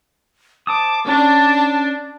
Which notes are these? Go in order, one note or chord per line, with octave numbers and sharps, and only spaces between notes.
C5 A5 D6 D#6
C#4 D4 A5